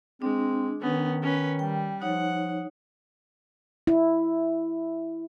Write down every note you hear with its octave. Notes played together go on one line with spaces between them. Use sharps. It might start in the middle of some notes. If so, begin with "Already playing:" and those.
G#3 C4 D4
D#3 B3 C#4
C#4 B4
G3 G5
F3 D#4 C#5 F#5
E4